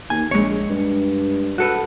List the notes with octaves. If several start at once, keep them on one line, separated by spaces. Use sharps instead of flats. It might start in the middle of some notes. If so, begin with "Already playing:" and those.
D#2 G#5
A#1 G#3 C#5
G2
F#4 A4 B4